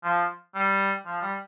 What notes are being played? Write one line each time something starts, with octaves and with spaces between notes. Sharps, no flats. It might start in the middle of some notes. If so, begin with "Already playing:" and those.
F3
G3
F3
G3